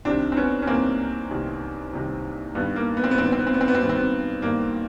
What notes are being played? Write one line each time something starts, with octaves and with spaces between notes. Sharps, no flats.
C2 C3 D#3 C4 D4
C4
B3 C#4
C#4
C2 C3 D#3 A#3 C4
C2 C3 D#3
C2 C3 D#3
G2 D#3 B3
A#3
B3
C4
B3
G2 D#3 C4
B3
C4
B3
C4
B3
C4
B3
C4
G2 D#3 B3
C4
B3
G2 D#3 A#3